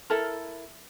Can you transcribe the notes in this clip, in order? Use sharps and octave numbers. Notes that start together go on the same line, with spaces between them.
E4 A4 A#4